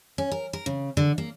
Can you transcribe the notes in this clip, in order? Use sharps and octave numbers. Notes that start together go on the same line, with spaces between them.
C#4
A#4
A#4
C#3
D3
A#3